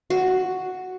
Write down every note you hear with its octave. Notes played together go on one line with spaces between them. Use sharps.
F#4